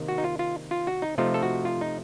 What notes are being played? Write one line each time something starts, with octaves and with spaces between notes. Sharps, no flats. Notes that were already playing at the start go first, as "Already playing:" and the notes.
Already playing: C3 D#3 A#3
F#4
D#4
F4
F4
F4
F#4
D#4
C3 F3 A3 D#4 F4
A4
F#4
F4
D#4